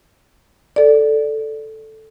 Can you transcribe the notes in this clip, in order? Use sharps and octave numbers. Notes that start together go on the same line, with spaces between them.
A4 D5